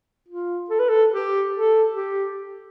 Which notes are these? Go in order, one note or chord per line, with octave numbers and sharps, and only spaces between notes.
F4
A4
B4
A4
G4
A4
G4